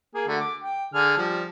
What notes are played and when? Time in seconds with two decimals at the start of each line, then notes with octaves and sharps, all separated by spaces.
0.15 A#3 G#4
0.28 D3 A3 F#4
0.40 D6
0.63 G5
0.94 D3 G#4 F6
1.18 F3 G3